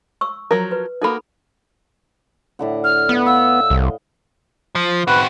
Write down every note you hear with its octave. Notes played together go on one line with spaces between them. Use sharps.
C#6 E6
F3 F#3 A#4
B4
A#3 D#4 F#4 A4 B5
A2 D3 F#5
F6
B3 D#5 F#5
F5 E6
C2
F3
C4 F#4 B4